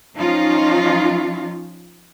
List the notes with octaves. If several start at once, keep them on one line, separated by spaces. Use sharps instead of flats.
F3 C#4 D#4 F4